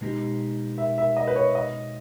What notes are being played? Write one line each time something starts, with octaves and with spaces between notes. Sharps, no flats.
B2 G#3 D#4 G4
E5
E5
D#5
B4
C#5
D#5